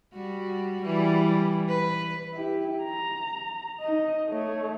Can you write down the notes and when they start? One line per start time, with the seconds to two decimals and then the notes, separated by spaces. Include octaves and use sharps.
0.13 G3 F#4
0.82 E3 G3
1.69 B4
2.33 E4 G4
2.84 A#5
3.80 D#4 D#5
4.28 A3 C#5